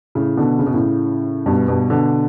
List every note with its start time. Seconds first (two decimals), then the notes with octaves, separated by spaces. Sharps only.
0.15 A2 C#3
0.37 B2 D3
0.59 C#3
0.67 B2
0.74 A2 C#3
1.46 G2 B2
1.68 G2 B2
1.90 B2 D3